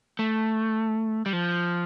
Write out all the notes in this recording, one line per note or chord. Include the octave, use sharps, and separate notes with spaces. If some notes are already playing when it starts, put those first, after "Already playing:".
A3
G3
F3